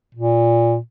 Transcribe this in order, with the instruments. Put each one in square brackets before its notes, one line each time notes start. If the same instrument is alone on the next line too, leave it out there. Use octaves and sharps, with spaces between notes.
[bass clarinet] A#2